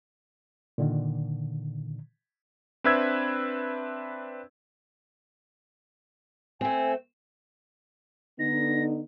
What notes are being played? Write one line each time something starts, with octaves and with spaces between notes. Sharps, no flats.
A#2 D3 D#3
C4 D4 B4 E5 E6 G#6
A3 C4 G#5
D3 B3 D#4 A#6